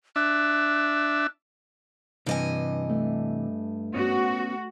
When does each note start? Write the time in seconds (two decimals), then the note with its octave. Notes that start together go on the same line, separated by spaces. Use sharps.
0.16 D4 E5 F#6
2.26 G2 C3 E3 D#5 G#5
2.89 A3
3.94 B3 C#4 F#4